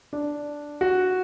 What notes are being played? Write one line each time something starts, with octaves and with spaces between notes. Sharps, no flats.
D4
F#4